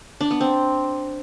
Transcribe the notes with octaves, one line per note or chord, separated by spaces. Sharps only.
D4
B3
C4